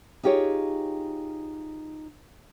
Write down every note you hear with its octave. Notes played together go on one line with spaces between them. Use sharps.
D#4 F4 G4 G#4 C#5